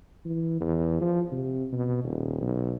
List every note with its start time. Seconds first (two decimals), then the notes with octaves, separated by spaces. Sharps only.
0.25 E3
0.61 E2
1.01 F3
1.32 C3
1.72 B2
2.04 D#1
2.41 B1